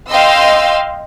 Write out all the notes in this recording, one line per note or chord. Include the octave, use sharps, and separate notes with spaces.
D#5 F5 G5 C6 E6